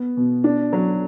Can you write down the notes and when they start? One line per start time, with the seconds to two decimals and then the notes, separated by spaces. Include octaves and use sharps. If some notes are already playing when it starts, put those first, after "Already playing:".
Already playing: B3
0.17 B2
0.44 D4
0.73 F#3